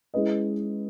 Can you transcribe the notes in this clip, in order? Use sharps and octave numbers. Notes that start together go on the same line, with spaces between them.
G#3 C#4 E4 B4 D#5